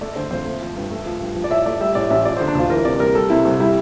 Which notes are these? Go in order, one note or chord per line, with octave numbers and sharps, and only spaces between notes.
A3 D5
D3 C5
F2 C5
A3
F3
G2
A3
F3
G2
F3
D5
A2 E5
A3 D5
G3 E5
A2 D5
A1 E5
F3 D5
C5
D3
D4
D2 F4
E3 A#4
C3 D5
G3 A#4
G3 A4
C3 E4
C2
G3 E4